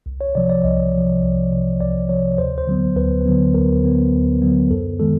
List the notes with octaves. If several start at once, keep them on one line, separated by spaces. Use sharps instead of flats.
C2
C#5
C3 F3 D5
D5
C2 D#5
C3 F3
C2
C3 F3
C2 D5
C3 F3 C#5
D2 C5
C5
D3 F#3 B3
D2 B4
D3 F#3 B3
D2 A#4
D3 F#3 B3
D2
D3 F#3 B3
F#2 A4
D#3 G#3 B3 A4